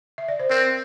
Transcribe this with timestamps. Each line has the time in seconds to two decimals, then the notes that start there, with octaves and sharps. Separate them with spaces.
0.18 E5
0.28 D5
0.40 C5
0.50 C4 A#4